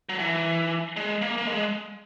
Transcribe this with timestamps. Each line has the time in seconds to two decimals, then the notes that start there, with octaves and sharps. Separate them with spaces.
0.09 F#3
0.19 E3
0.97 G#3
1.22 A#3
1.38 A#3
1.47 G#3